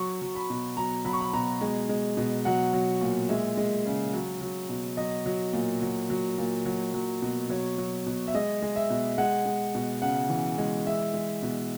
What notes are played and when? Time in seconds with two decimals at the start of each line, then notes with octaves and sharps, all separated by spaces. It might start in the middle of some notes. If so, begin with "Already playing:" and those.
Already playing: F#3 C#6
0.22 F#3
0.35 B5
0.50 B2
0.77 F#3 A#5
1.05 F#3 B5
1.13 C#6
1.21 B5
1.33 B2 A#5
1.61 G#3
1.89 G#3
2.17 B2
2.45 F#3 F#5
2.73 F#3
3.01 A#2
3.29 G#3 E5
3.57 G#3
3.86 C#3
4.13 F#3
4.41 F#3
4.69 B2
4.97 F#3 D#5
5.26 F#3
5.53 A#2
5.82 F#3
6.10 F#3
6.38 A#2
6.66 F#3
6.94 F#3
7.22 B2
7.49 F#3 C#5
7.78 F#3
8.06 B2
8.28 E5
8.34 G#3 D#5
8.62 G#3
8.76 E5
8.90 B2
9.18 G#3 F#5
9.46 G#3
9.74 B2
10.02 C#3 F#5
10.30 E3
10.58 G#3
10.86 G#3 E5
11.14 G#3
11.42 B2